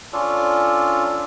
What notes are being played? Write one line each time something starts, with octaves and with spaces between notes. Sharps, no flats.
C#4 D4 F4 A4